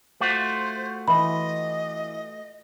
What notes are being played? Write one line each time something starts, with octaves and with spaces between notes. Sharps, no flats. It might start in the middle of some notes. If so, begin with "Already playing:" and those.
A3 F4 F#4 C5
E3 D#5 B5